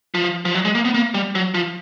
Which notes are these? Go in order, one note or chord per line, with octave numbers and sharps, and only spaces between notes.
F3
F3
F#3
G#3
A#3
B3
A#3
G3
F#3
F3